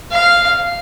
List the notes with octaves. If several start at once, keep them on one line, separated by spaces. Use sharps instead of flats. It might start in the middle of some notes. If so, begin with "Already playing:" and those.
F5